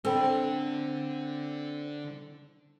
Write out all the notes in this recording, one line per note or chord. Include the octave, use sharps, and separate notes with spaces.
D3 C4 D4 A4 G5 B5